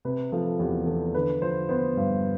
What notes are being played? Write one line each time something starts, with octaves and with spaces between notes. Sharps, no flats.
C3 B4
F3 A4
E2 G4
E2 A4
D3 B4
F3 C5
B3 C5
G2